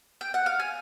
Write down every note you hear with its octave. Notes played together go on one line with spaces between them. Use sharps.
G5
F#5
F5
G#5